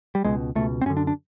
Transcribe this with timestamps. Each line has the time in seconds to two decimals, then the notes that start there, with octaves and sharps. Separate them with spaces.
0.15 G3
0.24 C#2 B2 G#3
0.55 C#2 B2 A3
0.81 C4
0.86 F#2 C#4
0.90 D3
0.97 D4
1.07 D4